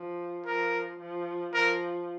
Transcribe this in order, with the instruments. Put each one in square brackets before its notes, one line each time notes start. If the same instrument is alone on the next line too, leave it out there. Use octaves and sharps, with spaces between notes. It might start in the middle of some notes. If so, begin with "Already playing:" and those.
Already playing: [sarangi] F3
[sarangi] F3 [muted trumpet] A#4
[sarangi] F3
[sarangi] F3 [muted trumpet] A#4